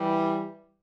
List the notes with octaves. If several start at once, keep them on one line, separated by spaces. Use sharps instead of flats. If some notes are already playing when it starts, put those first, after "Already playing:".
Already playing: E3 G3